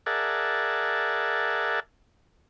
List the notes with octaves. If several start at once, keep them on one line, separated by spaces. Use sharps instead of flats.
G#4 A#4 D5 E5 F#5 A5